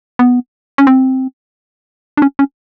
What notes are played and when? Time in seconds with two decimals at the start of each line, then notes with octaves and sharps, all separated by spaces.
0.19 B3
0.78 C#4
0.87 C4
2.17 D4
2.22 C#4
2.39 C#4